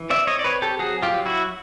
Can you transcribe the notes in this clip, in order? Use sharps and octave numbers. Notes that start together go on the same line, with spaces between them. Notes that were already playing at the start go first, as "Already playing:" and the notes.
Already playing: E3
C4 D5 E5
C#5 D#5
D5
C4 B4 C#5
G4 A4
F#3 F#4 G#4
F4 G4
F#3
E4 F#4